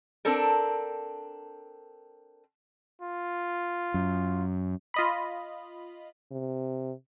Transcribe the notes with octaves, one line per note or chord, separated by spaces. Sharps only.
C4 D4 A4 A#4
F4
F#2
F4 D#5 B5
C3